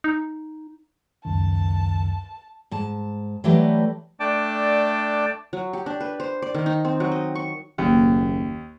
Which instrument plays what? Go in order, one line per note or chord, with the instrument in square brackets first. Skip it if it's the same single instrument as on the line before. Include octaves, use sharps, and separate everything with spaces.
[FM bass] D#4
[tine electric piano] C#2 F#2 D#3 [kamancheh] A5
[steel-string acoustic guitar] G#2 A5
E3 F#3 A3 G4 B4 D5
[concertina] A3 D4 D5 G5 A5 D6
[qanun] F#3
G4
D4
B4
C5
D5
D#3
D#4
C4
F#3
D#5
C#6
[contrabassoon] F#1 [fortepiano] D#2